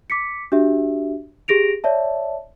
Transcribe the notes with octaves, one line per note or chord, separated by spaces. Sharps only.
D6 B6 C#7
D4 F#4 G4 E5
G4 G#4 A#6 D7 F7
C#5 D5 E5 A5